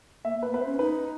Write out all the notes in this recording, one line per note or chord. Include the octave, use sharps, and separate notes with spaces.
A#3 E5
A#3 B4
B3 B4
C5
C#4
D#4 B4